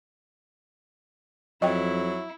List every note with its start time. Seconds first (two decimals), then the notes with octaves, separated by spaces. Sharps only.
1.62 F2 F#3 E4 D#5 G5